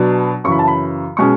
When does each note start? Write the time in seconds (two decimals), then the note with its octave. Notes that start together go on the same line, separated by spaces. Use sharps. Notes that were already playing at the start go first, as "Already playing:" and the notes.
Already playing: B2 F#3 B3 D4
0.44 F#2 C#3 E3 C#6
0.52 B5
0.59 A5
0.68 B5
1.17 B2 G#3 C#4 C#6